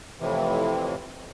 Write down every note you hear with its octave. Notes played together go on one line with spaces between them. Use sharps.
F2 A2 C3 E3